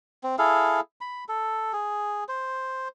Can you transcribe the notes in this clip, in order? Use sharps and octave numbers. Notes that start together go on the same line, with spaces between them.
C4
E4 G#4 A4 F5
B5
A4
G#4
C5